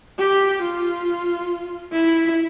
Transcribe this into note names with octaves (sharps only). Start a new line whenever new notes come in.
G4
F4
E4